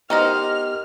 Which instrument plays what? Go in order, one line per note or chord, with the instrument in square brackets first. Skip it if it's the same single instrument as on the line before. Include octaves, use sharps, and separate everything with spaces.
[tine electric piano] B3 G4 A#4 [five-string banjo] D#4 C5 D#5 [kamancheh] F6